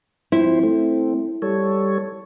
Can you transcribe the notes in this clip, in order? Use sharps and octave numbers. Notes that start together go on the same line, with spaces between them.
F3 C4 E4 C5
A3 C4
G3 A4 C#5